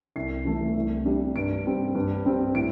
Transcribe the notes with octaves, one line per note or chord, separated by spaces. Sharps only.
C2 C7
C3 E3 A3
C2
C3 G3 D4
G2 D7
G3 C4
G2
G3 C4
A2 D7